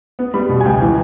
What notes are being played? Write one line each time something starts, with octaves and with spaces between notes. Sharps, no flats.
B3
G3 B5
B2
G#5
C#2 G5
E3